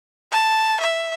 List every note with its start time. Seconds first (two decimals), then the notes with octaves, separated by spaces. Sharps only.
0.32 A5
0.81 E5